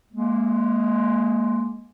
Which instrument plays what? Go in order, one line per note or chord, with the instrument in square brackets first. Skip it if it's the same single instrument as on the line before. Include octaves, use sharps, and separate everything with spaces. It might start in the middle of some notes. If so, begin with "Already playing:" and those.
[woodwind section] G#3 A#3